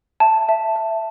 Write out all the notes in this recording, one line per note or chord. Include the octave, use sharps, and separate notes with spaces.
E5 A5
E5
E5